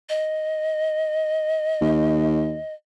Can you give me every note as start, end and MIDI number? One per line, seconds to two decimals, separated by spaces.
0.09 2.73 75
1.81 2.58 39